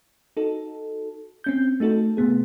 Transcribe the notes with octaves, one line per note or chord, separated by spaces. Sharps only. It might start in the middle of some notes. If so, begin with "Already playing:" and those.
D#4 F#4 A4
C4 C#4 G6
A3 D#4 F#4 A4
C3 A3 B3 G#4